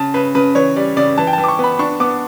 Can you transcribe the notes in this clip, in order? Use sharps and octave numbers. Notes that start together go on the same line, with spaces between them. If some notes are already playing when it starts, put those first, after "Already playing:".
Already playing: C#3 A5
C#3 B4
C#3 B4
E3 C#5
G3 D5
C#3 D5
E3 A5
G5
A5
E3
D6
C#6
B3 B5
D4 C#6
B3 D6